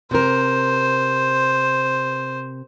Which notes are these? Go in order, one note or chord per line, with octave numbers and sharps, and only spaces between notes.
C3 A#4 C5